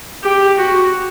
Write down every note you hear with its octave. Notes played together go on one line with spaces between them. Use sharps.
G4
F#4